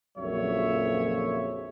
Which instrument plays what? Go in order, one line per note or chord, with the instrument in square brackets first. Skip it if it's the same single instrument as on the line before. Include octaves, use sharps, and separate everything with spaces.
[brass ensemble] A#1 F2 C#3 F#3 C#5 E5